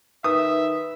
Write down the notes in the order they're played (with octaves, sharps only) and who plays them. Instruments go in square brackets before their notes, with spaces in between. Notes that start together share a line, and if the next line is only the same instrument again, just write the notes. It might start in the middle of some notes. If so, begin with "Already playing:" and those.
[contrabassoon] D#3 [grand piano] B4 [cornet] E5 [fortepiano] D#6